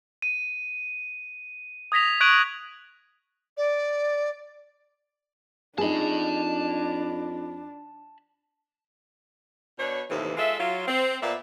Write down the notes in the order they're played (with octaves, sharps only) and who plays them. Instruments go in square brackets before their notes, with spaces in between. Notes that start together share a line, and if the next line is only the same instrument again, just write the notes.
[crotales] D#7
D#6 G#6 A#6 B6 F7
C#6 F#6 G#6 D7 D#7 F#7
[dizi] D5
[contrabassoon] F2 [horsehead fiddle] D4 [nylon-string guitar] D#4 G#4 [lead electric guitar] A5 B5
[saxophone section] B2 D4 B4 C#5
D#2 A2 C3 E3
G#3 F4 A4 E5
F#3 F4
C4
A#2 A#3 B3 D5 E5